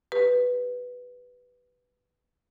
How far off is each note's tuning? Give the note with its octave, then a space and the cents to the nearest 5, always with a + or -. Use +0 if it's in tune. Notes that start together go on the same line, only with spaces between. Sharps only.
G4 +0 B4 +0